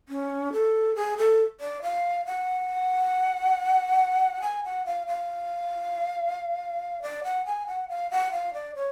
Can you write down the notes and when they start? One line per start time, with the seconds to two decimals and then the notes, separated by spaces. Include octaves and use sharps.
0.09 C#4
0.53 A4
0.95 G#4
1.18 A4
1.61 D5
1.82 F5
2.26 F#5
4.42 G#5
4.64 F#5
4.86 F5
5.07 F5
7.02 D5
7.24 F#5
7.46 G#5
7.67 F#5
7.89 F5
8.11 F#5
8.32 F5
8.54 D5
8.75 C#5